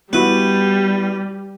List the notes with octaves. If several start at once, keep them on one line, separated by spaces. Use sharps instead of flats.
G3 B3 E4 F#4 B4